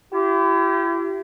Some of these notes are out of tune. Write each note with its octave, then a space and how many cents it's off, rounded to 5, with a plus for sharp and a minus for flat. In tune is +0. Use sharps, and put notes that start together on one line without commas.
E4 +40 G4 -25